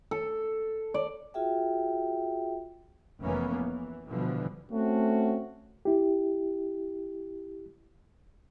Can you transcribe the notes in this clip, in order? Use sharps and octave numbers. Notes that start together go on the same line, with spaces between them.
A4
D5
F4 F#4 G#4 E5 G5
F1 F2 E3 A#3 B3 C#4
E3
B2 D3 E3 F3 G3
A3 C4 C#4 F#4
E4 G4